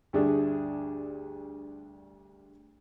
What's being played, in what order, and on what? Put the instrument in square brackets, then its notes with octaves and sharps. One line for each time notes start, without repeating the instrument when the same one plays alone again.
[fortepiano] D2 G2 A3 D4 G#4